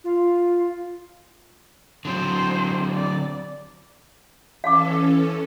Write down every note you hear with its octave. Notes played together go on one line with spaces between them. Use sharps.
F4
D3 F#3 C4 C5
D5
E3 C#4 A4 F5 A5 D6